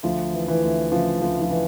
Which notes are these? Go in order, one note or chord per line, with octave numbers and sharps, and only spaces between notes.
D2 F3
E3
E3
D2
C#3 F3
D2 F3
F3
E3